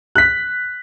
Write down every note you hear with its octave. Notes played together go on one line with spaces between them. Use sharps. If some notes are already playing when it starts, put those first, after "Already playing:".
F#6 B6